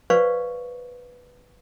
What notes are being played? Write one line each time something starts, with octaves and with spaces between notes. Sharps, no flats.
B4 C5 D5 F5 C#6